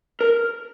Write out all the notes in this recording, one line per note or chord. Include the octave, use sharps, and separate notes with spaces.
A#4